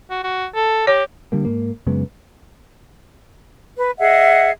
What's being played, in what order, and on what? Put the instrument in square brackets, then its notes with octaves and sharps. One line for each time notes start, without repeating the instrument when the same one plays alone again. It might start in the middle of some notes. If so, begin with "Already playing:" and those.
[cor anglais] F#4
F#4
A4
[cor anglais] G4 [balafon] C#5
[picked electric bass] D3 G3 A#3
G#2 A#3
F#2 C#3 G#3 B3
[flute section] B4
G#4 D#5 E5 F#5